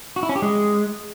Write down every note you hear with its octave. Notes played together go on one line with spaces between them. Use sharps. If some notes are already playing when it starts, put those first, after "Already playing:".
F#4
E4
C#4
G4
G#3